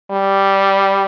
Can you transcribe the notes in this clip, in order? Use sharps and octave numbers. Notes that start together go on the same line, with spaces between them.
G3